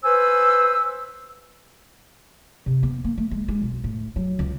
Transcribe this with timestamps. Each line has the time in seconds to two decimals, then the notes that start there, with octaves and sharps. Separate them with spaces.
0.04 B4 C5 G#5 E6
2.66 C3
2.83 B3
3.04 A#3
3.18 A3
3.31 G#3
3.48 G#3
3.61 B1
3.84 A2
4.16 F#3
4.39 C#2